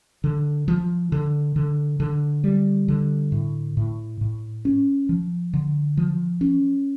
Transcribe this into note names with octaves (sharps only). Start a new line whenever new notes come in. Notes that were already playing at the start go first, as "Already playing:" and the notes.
D3
F3
D3
D3
D3
G3
D3
A2
A2
A2
C#4
F3
D3
F3
C#4